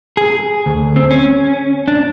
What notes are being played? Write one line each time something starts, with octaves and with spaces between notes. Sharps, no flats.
G#4
D2
C4
C#4
D4